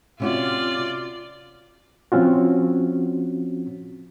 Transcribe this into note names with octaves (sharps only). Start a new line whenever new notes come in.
C3 C#4 F4 F#4 D5
F3 C4 C#4 F4 F#4